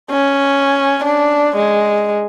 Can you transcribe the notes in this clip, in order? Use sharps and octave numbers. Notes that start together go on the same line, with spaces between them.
C#4
D4
G#3